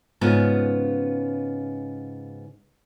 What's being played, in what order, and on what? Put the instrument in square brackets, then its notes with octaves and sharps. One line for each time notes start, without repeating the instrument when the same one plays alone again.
[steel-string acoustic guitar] G#2 C#3 B3 F4